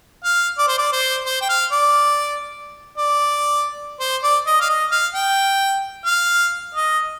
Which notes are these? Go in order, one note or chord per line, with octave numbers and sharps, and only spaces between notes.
F5
D5
C5
D5
C5
C5
G5
F5
D5
D5
C5
D5
D#5
F5
D#5
F5
G5
F5
D#5